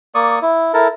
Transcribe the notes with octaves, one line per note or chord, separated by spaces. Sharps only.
A#3 D5 C#6 D#6
E4
E4 A4 A#4